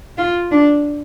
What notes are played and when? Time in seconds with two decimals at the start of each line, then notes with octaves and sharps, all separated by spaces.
0.18 F4
0.51 D4